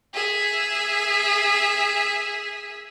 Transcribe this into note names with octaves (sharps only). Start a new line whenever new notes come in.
G#4 E5